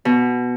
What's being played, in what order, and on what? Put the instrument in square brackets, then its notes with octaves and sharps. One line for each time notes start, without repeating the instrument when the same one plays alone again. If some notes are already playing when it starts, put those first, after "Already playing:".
[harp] B2